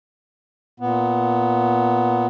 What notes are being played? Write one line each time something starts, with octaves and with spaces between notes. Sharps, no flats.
A#2 B3